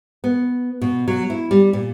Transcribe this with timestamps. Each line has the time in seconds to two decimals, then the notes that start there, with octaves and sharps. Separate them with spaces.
0.24 B3
0.81 B2
1.08 F#3
1.30 E4
1.51 G3
1.73 A#2